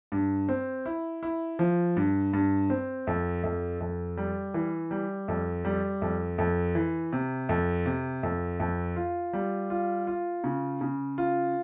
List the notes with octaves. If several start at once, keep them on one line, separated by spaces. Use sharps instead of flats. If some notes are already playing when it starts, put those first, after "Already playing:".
G2
C4
E4
E4
F3
G2
G2
C4
F2
F2
F2
G3
E3
G3
F2
G3
F2
F2
E3
C3
F2
C3
F2
F2
F4
G3
F4
F4
C#3
C#3
F4